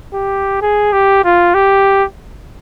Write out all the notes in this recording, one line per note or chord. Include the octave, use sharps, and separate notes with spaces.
G4
G#4
G4
F4
G4